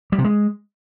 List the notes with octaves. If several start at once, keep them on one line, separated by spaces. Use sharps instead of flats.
G3
C3
G#3